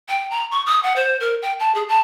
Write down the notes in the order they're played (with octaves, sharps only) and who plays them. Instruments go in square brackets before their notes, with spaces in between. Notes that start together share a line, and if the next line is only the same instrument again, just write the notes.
[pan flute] G5
A#5
C#6
D#6
F#5
C5
A#4
G5
A5
G#4
A5